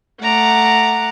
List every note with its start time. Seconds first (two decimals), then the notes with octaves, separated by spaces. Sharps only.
0.21 A3 F#5 A#5 D6